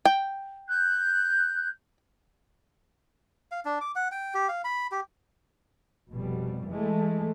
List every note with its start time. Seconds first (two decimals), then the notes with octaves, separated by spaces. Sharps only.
0.05 G5
0.69 F#6 G6
3.51 F5
3.65 D4
3.81 D6
3.95 F#5
4.12 G5
4.34 G4
4.49 F5
4.64 B5
4.92 G4
6.12 F1 B2 G3
6.68 E3 G#3 A3